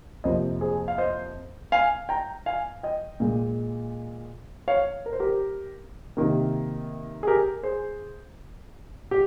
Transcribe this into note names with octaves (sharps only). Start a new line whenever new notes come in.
F2 C3 F3 A#3 C5 D#5
G#4 C5
F5
C5 D#5
F5 G#5
G5 A#5
F5 G#5
D#5 G5
A#2 G#3
C#5 F5
A#4
C5
G4 A#4
C3 D#3 A#3
G#4
G4 A#4
G#4 C5
G4